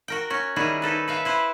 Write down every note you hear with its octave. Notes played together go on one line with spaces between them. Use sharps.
F#4 A#4 G5
C#4 F#4
D#3 G3 E4 F#4 G#4
D#4 A4 B4
B4 E5 F5
E4 B4 C5